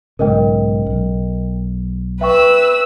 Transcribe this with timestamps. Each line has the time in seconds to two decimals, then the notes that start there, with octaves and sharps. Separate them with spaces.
0.19 B1 G#2 C#3 A#4 D#5 G5
0.86 B1
2.21 B4 E5 G5 C#6 E6